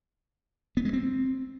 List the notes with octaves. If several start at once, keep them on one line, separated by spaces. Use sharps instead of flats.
B3
G#3
C4